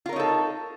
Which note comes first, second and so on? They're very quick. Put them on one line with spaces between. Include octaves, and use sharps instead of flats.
F4 A#4 C#5 D#4 A4